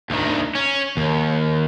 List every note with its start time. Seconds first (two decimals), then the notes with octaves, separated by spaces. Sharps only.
0.10 D2 D#3
0.55 C#4
0.97 D#2